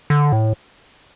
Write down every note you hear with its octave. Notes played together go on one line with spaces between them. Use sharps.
D3
A2